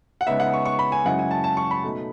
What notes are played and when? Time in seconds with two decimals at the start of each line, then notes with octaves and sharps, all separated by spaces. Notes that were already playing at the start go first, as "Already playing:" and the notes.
0.21 F#5
0.27 C#3 G#3 B3 D#4 E5
0.40 F#5
0.54 C#6
0.66 C#6
0.79 B5
0.92 G#5
1.05 F#2 C#3 G#3 C#4 E4 F#5
1.19 G#5
1.31 A5
1.44 A5
1.57 C#6
1.71 B5
1.84 B2 A3 D#4